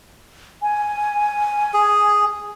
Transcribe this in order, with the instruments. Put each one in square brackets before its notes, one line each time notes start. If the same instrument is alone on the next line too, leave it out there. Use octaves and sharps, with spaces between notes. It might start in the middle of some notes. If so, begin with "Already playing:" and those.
[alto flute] G#5
[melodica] G#4